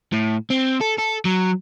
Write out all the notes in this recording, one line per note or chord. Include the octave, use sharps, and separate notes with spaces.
A2
C4
A4
A4
F#3